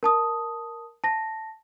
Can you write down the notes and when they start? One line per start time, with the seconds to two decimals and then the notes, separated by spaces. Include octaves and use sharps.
0.03 A#4 A5 D#6
1.04 A5 A#6